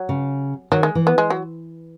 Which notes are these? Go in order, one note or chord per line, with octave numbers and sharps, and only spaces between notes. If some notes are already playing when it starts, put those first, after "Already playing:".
Already playing: F#3
C#3
D#3 F#3
G#3
E3
B3
G#3
F#3